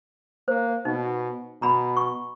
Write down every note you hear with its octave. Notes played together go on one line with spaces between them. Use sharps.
A#3 C5
B2 D#4
B2 A#5 B5
C#6